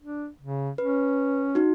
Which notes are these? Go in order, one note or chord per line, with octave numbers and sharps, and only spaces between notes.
D4
C#3
C#4 B4
D#4 F#4